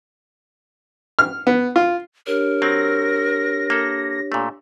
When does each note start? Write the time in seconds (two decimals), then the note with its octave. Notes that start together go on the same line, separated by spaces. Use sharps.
1.19 F6
1.47 B3
1.76 F4
2.27 D4 G4 A#4 C#5
2.62 F#3 C4 A#6
3.70 A#3 A4
4.32 A#2 A3